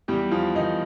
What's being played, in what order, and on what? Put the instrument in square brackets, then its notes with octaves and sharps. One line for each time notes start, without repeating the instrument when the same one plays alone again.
[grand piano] E2 G3 G4
E2 F3 F4
E2 D#3 D#4